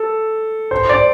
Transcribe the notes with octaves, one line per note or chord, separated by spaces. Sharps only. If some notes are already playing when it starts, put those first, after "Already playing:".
Already playing: A4
C5
D5